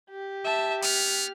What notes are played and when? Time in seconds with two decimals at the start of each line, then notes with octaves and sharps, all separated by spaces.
0.11 G4
0.45 E5 A5
0.83 B3 F6